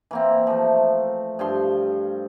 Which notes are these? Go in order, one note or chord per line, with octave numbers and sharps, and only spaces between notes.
E3 A#3 C4
F3 A3
G2 F3 C6